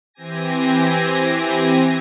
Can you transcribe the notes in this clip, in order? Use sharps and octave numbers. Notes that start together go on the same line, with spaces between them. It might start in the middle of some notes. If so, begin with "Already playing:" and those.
E3 C4 G4 G#5 A#6